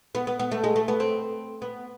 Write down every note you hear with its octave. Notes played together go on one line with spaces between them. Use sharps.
B3
B3
B3
A3
G#3
A3
B3
C4
B3